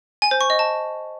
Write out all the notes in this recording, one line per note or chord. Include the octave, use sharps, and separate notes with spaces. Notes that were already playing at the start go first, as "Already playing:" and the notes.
G#5
C5
C#6
D#5
A5